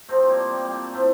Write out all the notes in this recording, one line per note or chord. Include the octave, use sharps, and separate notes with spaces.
C3 F3 A3 C4
G3 A#3
G3 A#3
G3
A3
A2 F3 A3